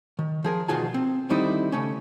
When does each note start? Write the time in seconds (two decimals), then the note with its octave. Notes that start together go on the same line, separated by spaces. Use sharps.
0.19 D#3
0.44 F3 G#4 A#4
0.68 D2 B2 D#3 F4 G#4 A5
0.94 C4
1.30 D3 D#3 G3 C4 D#4 E4
1.72 C#3 A3 C#4